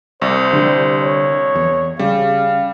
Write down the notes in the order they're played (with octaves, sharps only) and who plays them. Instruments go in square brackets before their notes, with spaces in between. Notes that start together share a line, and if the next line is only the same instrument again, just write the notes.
[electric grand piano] C2 [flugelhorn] C5
[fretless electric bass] D3 G3
[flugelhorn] C#5
[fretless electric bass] E2
[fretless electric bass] C#3 [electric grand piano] G3 [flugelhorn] F5